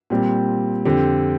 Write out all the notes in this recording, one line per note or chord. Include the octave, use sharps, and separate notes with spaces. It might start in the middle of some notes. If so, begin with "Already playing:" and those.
A#2 G3 C4 G4
F2 D3 F3 C4 G4